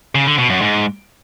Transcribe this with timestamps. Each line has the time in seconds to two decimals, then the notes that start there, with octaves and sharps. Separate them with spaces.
0.15 C#3
0.27 D3
0.38 B2
0.50 F#2
0.61 G#2